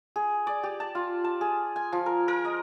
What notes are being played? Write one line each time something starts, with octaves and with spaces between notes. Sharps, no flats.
G#4
D5
G4
A5
F4
A5
G#4
G#5
F3
A#4
A#4
D#5